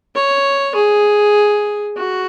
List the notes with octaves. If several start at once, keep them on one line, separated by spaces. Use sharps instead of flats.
C#5
G#4
F#4